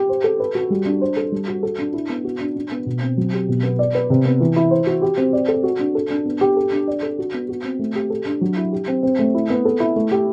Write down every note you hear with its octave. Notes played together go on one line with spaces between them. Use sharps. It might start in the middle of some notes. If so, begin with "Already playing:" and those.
Already playing: G4
C5
A4
B4
F#4
G3
D4
C5
A4
G3
F#4
A4
D4
E4
B3
F#4
D4
D4
B3
B2
C4
F#3
G4
B2
B3
D5
B4
C3
B3
E3
E4
C5
F#4
G4
C4
D5
A4
F#4
D4
A4
D4
B3
G4
A4
D4
D5
A4
F#4
B3
F#4
C4
A3
G4
A4
D4
F#3
E4
G4
C4
C4
A3
E4
B3
A4
E4
A3
G4